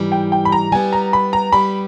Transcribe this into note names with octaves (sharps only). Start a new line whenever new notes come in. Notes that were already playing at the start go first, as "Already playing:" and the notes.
Already playing: G#2 E3 G3
G5
G5
B5
A#5
G3 B3 G4 G#5
A#5
B5
A#5
G3 B3 G4 B5